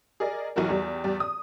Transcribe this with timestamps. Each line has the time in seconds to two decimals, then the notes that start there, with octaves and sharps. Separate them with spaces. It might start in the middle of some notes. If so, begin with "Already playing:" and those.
0.20 G#4 A#4 D5 D#5
0.56 B1 E3 F#3 F#4 A#4
0.69 E2 G3
1.04 E2 G3 D5
1.20 D#6